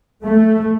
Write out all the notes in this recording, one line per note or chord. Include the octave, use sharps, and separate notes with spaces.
A3